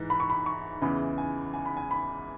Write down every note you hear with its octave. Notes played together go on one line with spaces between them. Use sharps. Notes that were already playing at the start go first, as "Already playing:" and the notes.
Already playing: G#2 E3
B5
C#6
B5
C#6
E2 C#3 E3 B5
G#5
G#5
B5
G#5
B5